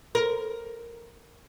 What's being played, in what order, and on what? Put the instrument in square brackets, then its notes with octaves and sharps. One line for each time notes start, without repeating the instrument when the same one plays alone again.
[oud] A#4